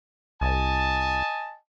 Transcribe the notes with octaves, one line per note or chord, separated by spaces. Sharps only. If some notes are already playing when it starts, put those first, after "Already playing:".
C2 D#5 G#5 A5